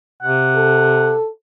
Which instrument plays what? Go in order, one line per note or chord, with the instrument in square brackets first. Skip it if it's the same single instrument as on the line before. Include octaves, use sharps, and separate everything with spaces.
[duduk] C3 [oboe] F#5
[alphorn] A4